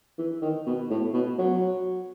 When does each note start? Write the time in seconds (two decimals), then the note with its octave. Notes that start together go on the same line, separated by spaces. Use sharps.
0.18 E3
0.41 D#3
0.66 B2
0.90 A2
1.13 B2
1.38 F#3